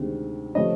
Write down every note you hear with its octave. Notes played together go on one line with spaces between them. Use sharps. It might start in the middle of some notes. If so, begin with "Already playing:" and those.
Already playing: D2 C3 D#3 G#3 C4
C3 F3 A3 C#4 D#5